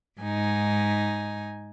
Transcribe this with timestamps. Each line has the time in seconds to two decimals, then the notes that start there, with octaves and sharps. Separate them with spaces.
0.21 G#2 D#4 G#5